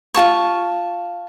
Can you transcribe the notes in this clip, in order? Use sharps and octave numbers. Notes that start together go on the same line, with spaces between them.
F4 F#4 A5 C#6